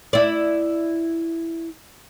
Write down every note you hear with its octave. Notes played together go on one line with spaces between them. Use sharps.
E4 D5